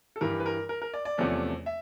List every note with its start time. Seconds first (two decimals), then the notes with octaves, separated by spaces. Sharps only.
0.16 A4
0.21 G2 E3 G3 A#4
0.40 B4
0.46 A#4
0.69 A#4
0.82 A#4
0.94 D5
1.05 D5
1.18 E2 C3 F3 A3 C#4
1.66 E5